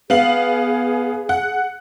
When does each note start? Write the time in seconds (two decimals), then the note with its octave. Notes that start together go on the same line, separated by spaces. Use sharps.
0.10 B3 G#4 F5 F#7
1.29 F#5